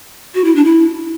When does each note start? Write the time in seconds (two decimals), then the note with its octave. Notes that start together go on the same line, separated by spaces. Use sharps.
0.35 F#4
0.44 E4
0.55 D4
0.65 E4